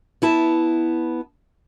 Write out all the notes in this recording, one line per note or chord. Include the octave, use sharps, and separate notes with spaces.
B3 E4 A5